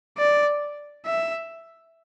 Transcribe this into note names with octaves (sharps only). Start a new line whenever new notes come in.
D5
E5